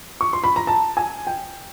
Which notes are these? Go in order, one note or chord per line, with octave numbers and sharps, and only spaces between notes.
C#6
C6
B5
A#5
A5
G#5
G5